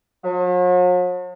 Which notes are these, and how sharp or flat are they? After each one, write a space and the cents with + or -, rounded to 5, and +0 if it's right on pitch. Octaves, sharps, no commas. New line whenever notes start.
F#3 -45